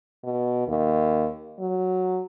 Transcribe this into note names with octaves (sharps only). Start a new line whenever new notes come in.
B2
D#2
F#3